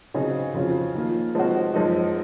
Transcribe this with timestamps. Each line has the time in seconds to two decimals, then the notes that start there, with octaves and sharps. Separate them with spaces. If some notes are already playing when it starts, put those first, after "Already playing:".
0.14 C#3 F#3 C4 D#4 G#4
0.54 F2 C#3 F#3 C4 F4
0.95 D#3 A#3 F4
1.35 F3 G#3 C4 F#4
1.74 F#2 F3 G#3 D#4